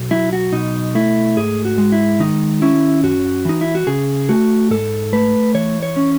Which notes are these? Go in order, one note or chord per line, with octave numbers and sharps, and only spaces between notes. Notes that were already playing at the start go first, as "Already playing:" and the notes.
Already playing: B1
F#3 E4
F#4
B2 D#4
A3 E4
G#2 G#4
F#4
G#3
E4
D#3 D#4
C#4 E4
F#2 F#4
E3 D#4
E4
F#4
C#3 G#4
A3 F#4
G#2 A4
A3 B4
E3 C#5
C#5
C#4